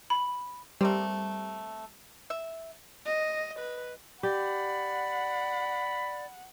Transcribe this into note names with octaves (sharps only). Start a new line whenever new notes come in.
B5
G3 A3 A#3 C4
E5
D#5
B4
G4 D5 F#5 B5